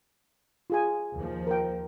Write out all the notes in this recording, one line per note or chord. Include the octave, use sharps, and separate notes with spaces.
F4 G#4 G#5
D#2 F3
A#4 G5